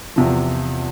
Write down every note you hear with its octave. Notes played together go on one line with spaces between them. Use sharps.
E2 C3 F3